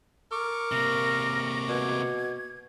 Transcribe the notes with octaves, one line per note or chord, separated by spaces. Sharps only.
A4 A#4 C#6 D6
C3 A#3 A#6
B2 G#6